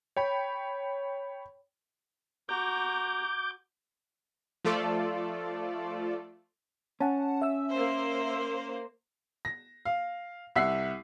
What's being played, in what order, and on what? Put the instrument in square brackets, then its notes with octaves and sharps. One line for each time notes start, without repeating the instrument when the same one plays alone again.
[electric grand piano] C#5 G5 B5
[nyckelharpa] F#4 A#5 [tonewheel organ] D6 G6
[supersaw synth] F3 A3 F4 A4 D5
[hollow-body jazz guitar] C#4 [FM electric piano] F#5 A5
[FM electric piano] E5 E6
[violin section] A#3 C5
[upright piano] A#6
F5
C2 E5 F#5 B6 C7